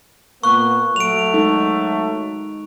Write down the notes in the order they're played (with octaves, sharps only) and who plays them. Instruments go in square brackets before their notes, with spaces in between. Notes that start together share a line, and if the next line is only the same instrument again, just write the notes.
[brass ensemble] A#2 A#3 B3 [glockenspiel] C#6 F#6
[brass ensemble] F#3 A3 [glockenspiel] D7 F7
[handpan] G#3 D#4 A4